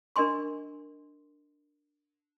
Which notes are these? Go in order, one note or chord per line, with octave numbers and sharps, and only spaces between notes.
D4 A#4 D#5 G#5 C6 C#6